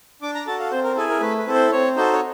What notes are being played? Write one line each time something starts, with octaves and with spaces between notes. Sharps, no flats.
D4 D6
A#5
F#4 A4 A5
F5
C4 C5
A#4
E4 G#4 A4
A#4
A3 B4
B4
C4 E4 A4
C5
C4 C#5
D#4 F#4 A4 C5
C#5